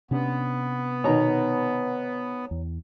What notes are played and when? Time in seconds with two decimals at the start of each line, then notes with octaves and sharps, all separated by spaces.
0.11 C3 B3 C#4 D4
1.04 B2 D#3 C#5 A#5
2.51 E2